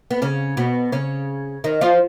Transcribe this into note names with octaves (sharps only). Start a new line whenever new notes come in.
B3
C#3 C#4
B2 B3
C#3 C#4
D#3 D#4
F3 F4